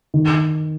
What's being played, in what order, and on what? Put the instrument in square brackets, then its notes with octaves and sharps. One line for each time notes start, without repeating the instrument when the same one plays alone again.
[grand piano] D#3